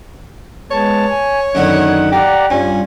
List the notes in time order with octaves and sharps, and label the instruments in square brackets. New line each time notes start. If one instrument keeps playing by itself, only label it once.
[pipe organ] G#3 B3 A5 [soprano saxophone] C#5
[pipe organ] G#5
[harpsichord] F#2 D3 B3 [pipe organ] D#3 D#4 F#5
[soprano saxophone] G4 [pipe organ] D5 F#5 A#5
[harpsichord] G2 [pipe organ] G3 F4 [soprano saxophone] C#4